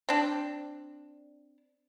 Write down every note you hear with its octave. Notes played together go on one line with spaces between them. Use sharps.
C4 D4